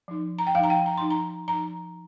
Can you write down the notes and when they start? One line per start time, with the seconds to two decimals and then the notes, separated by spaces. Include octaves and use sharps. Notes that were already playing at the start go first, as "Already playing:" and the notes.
0.08 F3 D#4
0.39 A#5
0.47 G5
0.55 F3 F5
0.59 D#4 A#5
0.70 G5
0.86 A#5
0.98 F3 D#4 C6
1.10 A#5
1.48 F3 D#4 A#5